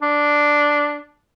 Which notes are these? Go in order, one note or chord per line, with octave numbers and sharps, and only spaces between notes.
D4